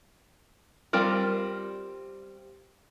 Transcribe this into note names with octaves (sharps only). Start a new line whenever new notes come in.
G3 C4 F4 A#4